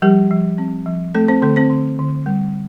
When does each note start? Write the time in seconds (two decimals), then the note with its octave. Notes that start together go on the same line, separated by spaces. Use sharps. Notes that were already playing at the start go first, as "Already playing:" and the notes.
0.02 F3 G3 G4
0.31 F3
0.58 C4
0.86 F3
1.14 A3 C4 A4
1.28 C4 C5
1.42 D3 A3 A4
1.56 C4 C5
1.70 D3
1.99 D3
2.26 G3